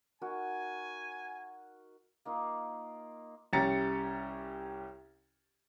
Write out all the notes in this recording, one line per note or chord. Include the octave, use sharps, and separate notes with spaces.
D#4 F#4 A#4 G#5
A#3 D#4 F4
C2 C#4 G4 A#5 A6 C#7